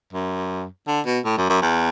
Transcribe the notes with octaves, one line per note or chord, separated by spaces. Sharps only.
F#2
D3
B2
A2
F#2
F#2
E2